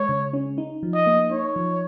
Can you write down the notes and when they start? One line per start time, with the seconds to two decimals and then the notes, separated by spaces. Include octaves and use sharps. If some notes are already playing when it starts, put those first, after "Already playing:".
Already playing: G#3 C#5
0.09 C#3
0.33 C#4
0.58 D#4
0.83 F3
0.94 D#5
1.07 A#3
1.31 D#4 C#5
1.56 F3